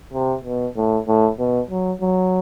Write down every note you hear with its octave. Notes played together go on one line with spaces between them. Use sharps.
C3
B2
A2
A2
B2
F#3
F#3